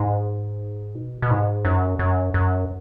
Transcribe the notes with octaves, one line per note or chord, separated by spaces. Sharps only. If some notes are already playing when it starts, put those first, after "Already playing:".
Already playing: G#2
B2
B2
G#2
F#2
F#2
F#2